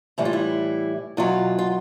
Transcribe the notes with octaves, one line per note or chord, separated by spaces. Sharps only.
A2 E3 G3 E4
F4
E4
E2 B2 F#3 F4
F4